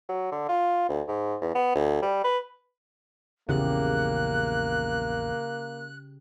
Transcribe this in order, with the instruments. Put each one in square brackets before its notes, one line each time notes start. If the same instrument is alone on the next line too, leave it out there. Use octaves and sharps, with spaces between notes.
[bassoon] F#3
D3
F4
D2
G#2
E2
B3
D2
G3
B4
[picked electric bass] A#1 E2 [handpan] C#3 G4 [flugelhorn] A#3 [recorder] F#6